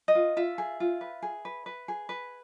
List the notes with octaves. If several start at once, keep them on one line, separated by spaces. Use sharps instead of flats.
D#5
F4
F4 E5
G#4
F4
B4
G#4
B4
B4
G#4
B4